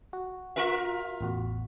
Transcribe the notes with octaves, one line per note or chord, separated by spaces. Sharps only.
F#4
F4 A#4 E5
A1 E2 F#4